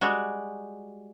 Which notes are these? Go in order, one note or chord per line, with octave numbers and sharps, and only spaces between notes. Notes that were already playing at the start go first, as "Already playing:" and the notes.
G3 G#3 F#4